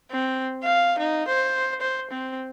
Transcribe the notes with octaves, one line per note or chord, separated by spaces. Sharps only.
C4
F5
D#4
C5
C5
C4